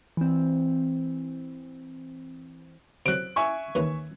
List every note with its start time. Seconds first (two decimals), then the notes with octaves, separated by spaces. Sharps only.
0.17 E3 C4
3.06 C3 F#3 F#6 D7
3.36 E5 G#5 C#6
3.75 D#2 E3 C#4